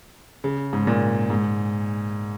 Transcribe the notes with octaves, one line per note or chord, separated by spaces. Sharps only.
C#3
G#2
A#2
G#2